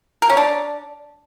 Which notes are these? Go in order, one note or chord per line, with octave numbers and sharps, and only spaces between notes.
A#4
C#4
D4